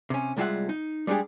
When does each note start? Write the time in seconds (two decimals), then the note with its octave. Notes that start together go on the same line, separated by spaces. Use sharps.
0.10 C3 C#4
0.37 C2 G3 G#3 F4 E5 F#5
0.69 D#4
1.07 G3 G#3 B3 D4 G4 G#4